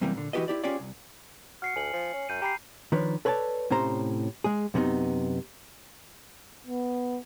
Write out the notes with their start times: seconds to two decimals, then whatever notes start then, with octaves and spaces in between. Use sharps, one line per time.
0.01 F#2 C3 E3 G3 A#3
0.15 A#2 D3
0.33 E3 E4 F#4 G4 B4 D#5
0.48 E4 G4 D5
0.64 C#4 F4 G4 G#4 C#5 D5
0.80 C2
1.62 F#4 F6 C7 C#7
1.76 D2 G#5 F#7
1.93 F3
2.14 C#4
2.29 F#2 G6 D#7
2.42 G4 A#5 B5 C7
2.92 D#3 F3 D4 B4 C#5
3.25 A4 B4 C#5 D5 G#5 A5
3.70 A2 C3 C#4 C5 A#5
4.44 G#3 G#4
4.74 F#2 C3 B3 C4 D#4
6.67 B3